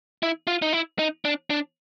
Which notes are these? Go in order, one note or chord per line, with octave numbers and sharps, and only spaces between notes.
E4
F4
D#4
E4
D#4
D4
D4